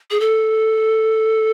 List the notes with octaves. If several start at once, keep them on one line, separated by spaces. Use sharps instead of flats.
G#4
A4